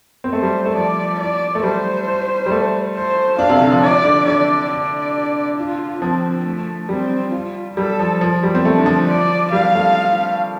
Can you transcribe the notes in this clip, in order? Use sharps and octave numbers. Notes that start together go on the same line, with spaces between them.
C4
A3 C5
G3
A3
F3 D5
D5
A3
G3 C5
G3
A3
C5
D4 F5
C3
D3
F3
D5
D3
D3 D5
D5
F4
F3 C4
A3
G3 C4
F4
G3 A4
F3
F3
G3
C4
A3
D3
F3
D5
G3 F5
A3